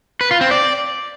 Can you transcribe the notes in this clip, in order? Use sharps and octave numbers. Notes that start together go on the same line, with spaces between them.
B4
F4
C4
D5